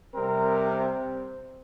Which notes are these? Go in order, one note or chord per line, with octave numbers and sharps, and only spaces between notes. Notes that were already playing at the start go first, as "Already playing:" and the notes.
C3 G3 C4 A#4
C4